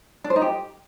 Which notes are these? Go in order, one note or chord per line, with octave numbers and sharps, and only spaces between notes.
D4
C5
D#4
G4